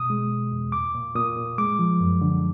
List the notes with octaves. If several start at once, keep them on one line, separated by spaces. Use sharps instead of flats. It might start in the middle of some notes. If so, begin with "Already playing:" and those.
Already playing: B2 D#6
G#3
B2
E2
A#2 D6
A#2
A#2 D#6
A#2
G#3 D6
F3
F#2
D3